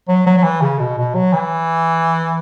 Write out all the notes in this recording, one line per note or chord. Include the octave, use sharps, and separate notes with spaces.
F#3
F#3
F#3
E3
C#3
B2
B2
F#3
E3